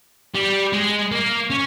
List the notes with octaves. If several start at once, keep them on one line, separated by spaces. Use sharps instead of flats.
G3
G#3
A#3
C#4